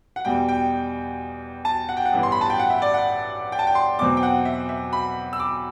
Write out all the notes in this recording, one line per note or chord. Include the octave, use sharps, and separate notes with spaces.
F#5
E2 B2 G3 G5
G5
A5
F#5
G5
F#5
A1 G2 E3 B3
C6
B5
A5
G5
F#5
E5
D5
F#5
G5
A5
G5
C6
E2 B2 F#3 C4 D6
G5
F#5
E5
E5
B5
E6
D6